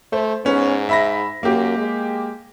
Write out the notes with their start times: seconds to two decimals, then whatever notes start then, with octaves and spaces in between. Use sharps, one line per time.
0.13 A3 C5
0.45 G#2 B3 C#4
0.89 E5 B5 A#6
1.43 F#2 A#3 G4
1.78 G#3